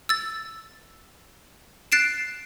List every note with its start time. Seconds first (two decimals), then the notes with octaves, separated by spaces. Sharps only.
0.09 E6 A6
1.92 F#6 A6 C7 D7 E7